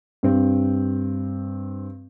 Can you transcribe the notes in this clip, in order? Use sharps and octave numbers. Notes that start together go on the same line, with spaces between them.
G2 C4